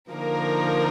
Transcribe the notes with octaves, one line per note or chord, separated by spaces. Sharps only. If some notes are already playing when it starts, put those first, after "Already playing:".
D3 F3 A#3 D#4 A#4